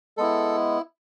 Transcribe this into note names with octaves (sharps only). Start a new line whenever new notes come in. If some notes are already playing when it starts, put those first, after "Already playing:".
G#3 B3 E4 A4